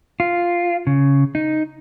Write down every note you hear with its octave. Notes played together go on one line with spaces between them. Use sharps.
F4
C#3
D#4